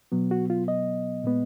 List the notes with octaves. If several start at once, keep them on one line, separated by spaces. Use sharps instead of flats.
B2 F#3 B3
F#4
F4
D#5
A#2 G#3 B3